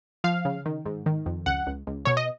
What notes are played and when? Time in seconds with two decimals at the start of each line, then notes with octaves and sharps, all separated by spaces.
0.24 F3 F5
0.45 C#3
0.66 D#3
0.86 G#2
1.06 D#3
1.26 F2
1.46 C#2 F#5
1.67 C#2
1.87 C#2
2.05 B2 C#5
2.17 D#5